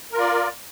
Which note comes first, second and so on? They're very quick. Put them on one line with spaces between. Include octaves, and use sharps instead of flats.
A#4 F4 D5